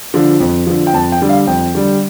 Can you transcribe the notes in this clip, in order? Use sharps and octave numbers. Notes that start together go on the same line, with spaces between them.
D3 F3
F2
D3 F3
G5
F2 A5
G5
D3 G3
F5
F2 G5
D3 G3